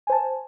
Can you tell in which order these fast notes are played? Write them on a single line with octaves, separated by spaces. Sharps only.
G#5 C5 A5